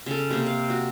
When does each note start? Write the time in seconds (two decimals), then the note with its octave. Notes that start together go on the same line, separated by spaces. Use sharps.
0.06 C#3 A4
0.30 C3 A#3
0.46 F5
0.70 F#4